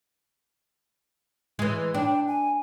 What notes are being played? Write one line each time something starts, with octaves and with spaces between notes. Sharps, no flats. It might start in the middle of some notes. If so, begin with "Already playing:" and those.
E3 G#3
D4 G5
G#5